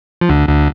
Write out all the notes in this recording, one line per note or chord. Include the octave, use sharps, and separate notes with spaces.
F3
D2 D3
D2 D3